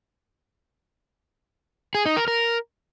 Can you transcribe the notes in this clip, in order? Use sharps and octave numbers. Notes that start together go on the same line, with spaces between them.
G#4
D#4
A#4
A#4